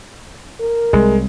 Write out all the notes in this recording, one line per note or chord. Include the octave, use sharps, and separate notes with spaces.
A#4
C2 G#3